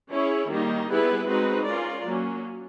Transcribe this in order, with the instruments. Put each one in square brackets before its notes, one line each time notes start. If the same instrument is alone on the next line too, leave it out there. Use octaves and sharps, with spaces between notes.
[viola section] C#4 E4 G#4 C#5
D#3 G3 A#3 D#4 G4
G3 B3 E4 G#4 B4
G#3 C4 D#4 F#4 B4
C#4 F4 A#4 D5
F#3 A#3 C#4